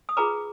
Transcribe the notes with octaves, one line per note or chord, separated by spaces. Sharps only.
D#6
F4 G#4 B4 A#5 D6